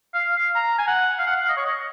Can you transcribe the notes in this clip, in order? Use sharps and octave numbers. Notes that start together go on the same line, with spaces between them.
F5
F5
A#5
G#5
F#5
F5
F#5
F5
D#5
C#5
D#5